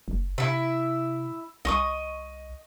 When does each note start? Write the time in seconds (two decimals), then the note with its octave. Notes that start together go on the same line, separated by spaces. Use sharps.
0.08 F#1
0.38 C3 E4 E5
1.65 C2 D#5 C#6 D#6